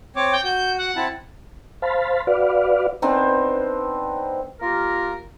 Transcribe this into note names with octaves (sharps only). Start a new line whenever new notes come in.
C4 C#5 D6
G5
F#4 G6
F#5
C4 E4 A5
C5 F5 A5 B5
F#4 B4 D5 F5
B3 C4 D4 D#4
A#3 F4 G4 A#4